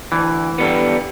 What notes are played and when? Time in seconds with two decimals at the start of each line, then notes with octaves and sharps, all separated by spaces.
0.12 D2 E3
0.58 D3 G3 B3